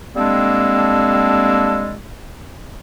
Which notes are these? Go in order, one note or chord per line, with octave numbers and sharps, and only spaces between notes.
G3 G#3 A#3 C4 D4 A4